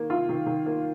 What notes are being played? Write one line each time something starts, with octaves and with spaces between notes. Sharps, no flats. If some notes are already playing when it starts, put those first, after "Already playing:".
Already playing: D#3 A#3
F4
D#3
D#3
A#3